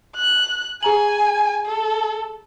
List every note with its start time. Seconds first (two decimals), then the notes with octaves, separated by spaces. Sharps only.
0.16 F#6
0.83 G#4 G#5 A#5 F#7
1.66 A4